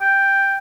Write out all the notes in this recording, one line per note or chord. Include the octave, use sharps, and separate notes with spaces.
G5